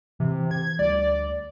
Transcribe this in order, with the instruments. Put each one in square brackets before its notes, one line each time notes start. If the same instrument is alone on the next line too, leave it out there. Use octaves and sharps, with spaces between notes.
[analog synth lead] C3 [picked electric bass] E3
[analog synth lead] G#6
[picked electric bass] D2 G3 [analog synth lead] D5